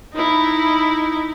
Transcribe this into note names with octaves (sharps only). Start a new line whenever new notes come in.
D#4 E4